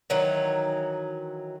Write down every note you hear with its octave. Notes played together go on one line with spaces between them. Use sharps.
D#3 E3 F#3